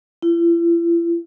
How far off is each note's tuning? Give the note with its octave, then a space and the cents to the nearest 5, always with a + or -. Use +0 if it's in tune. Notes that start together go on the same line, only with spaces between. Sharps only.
E4 +45